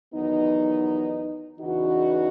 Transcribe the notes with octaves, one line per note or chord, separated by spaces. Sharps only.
E2 D#3 F#3 B3 D#4
E2 C#3 E3 D#4 F#4